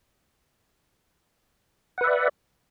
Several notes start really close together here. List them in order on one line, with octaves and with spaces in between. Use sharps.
F#5 B4 E5 D5